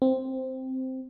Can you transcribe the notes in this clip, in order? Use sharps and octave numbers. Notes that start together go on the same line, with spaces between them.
C4